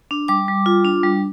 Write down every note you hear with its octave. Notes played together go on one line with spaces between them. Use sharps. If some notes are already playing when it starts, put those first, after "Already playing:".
D4
G3 D6
G3
F4
D4
G3